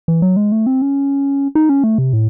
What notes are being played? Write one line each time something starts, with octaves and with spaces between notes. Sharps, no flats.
E3
F#3
G#3
A3
C4
C#4
D#4
C#4
A3
C3
A2